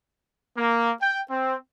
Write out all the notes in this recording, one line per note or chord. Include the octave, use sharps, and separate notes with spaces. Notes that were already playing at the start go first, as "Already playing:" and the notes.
A#3
G5
C4